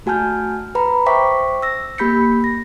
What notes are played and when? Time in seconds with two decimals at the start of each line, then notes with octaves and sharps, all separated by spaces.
0.06 A3 F#4 G#5 A5 F6 G6
0.75 B4 A#5 B5
1.06 C5 E5 G5 C#6 D6 B6
1.62 E6 A#6
1.98 A#3 G4 B5 G6 B6 C#7
2.44 A#6